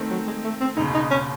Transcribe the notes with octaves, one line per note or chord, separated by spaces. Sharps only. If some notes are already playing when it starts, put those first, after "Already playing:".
Already playing: D#3 A3 C4
F#3
G#3
A3
C4
E1 D#2 C#3 D#4
D#4
C#4